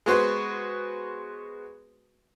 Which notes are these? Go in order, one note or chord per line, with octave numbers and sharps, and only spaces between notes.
G#3 B3 F#4 B4 C5